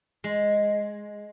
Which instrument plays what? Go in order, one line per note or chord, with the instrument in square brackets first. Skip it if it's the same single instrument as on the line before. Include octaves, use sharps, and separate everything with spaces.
[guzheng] G#3